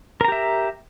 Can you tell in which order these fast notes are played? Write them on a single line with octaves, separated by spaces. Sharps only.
A#4 A#5 G4 E5